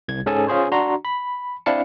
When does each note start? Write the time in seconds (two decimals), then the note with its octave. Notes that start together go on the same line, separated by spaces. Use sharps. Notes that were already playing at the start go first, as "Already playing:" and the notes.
0.08 C2 G#6
0.26 G#2 C#4 G#4 A4 G#5 A5
0.47 C#4 F4 G#4 C5 C#5
0.72 D4 F#4 A#5 C6
1.05 B5
1.66 C4 D4 E4 F5 A5 C#7